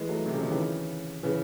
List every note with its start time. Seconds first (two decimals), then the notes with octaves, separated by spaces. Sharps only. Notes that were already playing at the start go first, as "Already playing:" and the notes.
Already playing: E3 G#3
0.09 F#3 A3
0.26 C3
0.34 C#3
0.41 C3 D#3
0.50 C#3 E3
1.23 C#3 E3